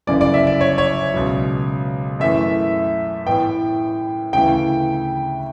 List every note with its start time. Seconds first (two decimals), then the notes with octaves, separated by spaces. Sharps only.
0.07 G1 F#2 C#3 E3 D5
0.21 D5
0.34 E5
0.47 D5
0.61 C#5
0.78 C#5
1.14 C#2 B2 F#3
2.20 F#2 E3 A3 E5
3.26 A2 E3 B3 G5
4.33 D2 C#3 E3 A3 E4 G5